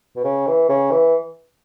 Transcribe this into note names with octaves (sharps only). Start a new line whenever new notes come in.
B2
C#3
E3
C#3
E3